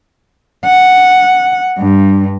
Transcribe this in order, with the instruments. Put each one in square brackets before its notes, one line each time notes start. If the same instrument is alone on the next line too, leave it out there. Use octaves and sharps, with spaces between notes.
[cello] F#5
G2